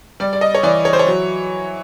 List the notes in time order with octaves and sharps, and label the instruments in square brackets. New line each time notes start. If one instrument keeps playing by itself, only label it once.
[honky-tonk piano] G3 D5
D5
D#5
C#5
E3 D5
C#5
C5
C#5
F#3